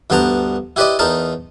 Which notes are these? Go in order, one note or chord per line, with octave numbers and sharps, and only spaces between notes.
D2 G2 B3 C5 A5 A#5
E4 G4 B4 C5 D5 D#5
E2 D#4 A#4 C5 A5